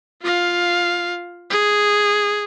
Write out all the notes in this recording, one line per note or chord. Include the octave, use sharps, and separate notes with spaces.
F4 F5
G#4